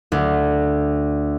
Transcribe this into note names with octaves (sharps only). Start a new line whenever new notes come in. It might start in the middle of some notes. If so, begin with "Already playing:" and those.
D2